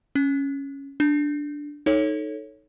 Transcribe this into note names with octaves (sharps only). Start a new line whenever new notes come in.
C#4
D4
D#4 A4 C#5